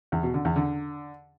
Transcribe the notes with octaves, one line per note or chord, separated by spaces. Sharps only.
E2
B2
D3
E2
D3